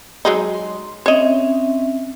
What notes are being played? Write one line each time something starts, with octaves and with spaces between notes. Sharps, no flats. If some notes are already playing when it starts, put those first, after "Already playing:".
F#3 G#3 D#4
C6
C4 C#4 C#5 D#5 E5